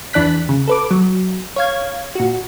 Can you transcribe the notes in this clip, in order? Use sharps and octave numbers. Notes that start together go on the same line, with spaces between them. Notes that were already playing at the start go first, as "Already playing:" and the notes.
E2 E3 D4 F#6 B6
C#3
A4 B4 D6
F#3
C#5 F5 G#6
A#2 F#4